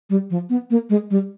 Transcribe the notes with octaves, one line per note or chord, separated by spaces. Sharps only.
G3
F3
B3
A#3
G#3
G3